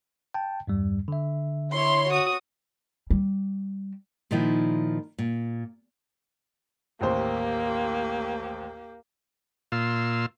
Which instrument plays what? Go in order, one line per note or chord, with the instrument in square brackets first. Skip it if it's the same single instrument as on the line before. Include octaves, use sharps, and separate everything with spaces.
[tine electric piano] G5 A5
E2 G2 G3
D3 E5
[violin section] E4 C#5 C6
F#4 D#6
[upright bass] G3
[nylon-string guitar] A#2 D#3 F3 D#4 E4
A#2
[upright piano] A1 D#2 C5 [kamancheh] A#3 G4
[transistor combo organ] A#2 F4 C6 E6